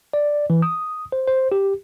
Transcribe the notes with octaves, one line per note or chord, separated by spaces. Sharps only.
D5
E3
D#6
C5
C5
G4